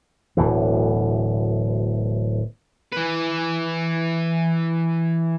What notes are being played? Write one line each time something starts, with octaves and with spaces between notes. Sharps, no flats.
D1 D2 B2 E3
E3 B4